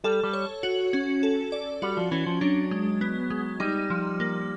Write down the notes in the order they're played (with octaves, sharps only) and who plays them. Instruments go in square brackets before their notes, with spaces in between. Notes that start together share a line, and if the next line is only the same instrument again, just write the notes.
[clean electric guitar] G3 [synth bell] A4
[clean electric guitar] G3
[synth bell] C#5
F#4
C#4
A4
D5
[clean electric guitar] G3 [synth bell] F#4
[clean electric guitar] F3
[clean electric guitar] E3 [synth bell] C#4
[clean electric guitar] F3
[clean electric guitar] F#3 [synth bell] D4
[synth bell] G#3
B3
G#3
[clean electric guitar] G3 [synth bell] D#4
[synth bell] F3
A#3